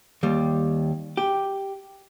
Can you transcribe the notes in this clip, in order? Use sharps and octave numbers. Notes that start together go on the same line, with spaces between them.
D#2 G3
G4